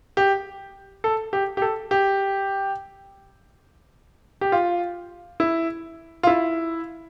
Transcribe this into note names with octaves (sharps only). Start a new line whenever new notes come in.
G4
A4
G4
G4
A4
G4
G4
F4
E4
F4
E4